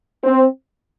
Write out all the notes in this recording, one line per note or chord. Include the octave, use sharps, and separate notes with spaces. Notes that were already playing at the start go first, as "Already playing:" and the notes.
C4